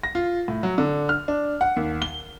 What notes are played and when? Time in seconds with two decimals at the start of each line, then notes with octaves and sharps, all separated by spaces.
0.03 A#6
0.15 F4
0.48 A2
0.63 F#3
0.78 D3
1.09 F6
1.28 D4
1.61 F#5
1.76 D#2
2.02 G7